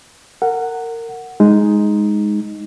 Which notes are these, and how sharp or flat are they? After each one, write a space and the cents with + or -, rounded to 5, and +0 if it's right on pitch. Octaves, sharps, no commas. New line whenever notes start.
A#4 -25 F#5 +0
G#3 +0 D#4 +0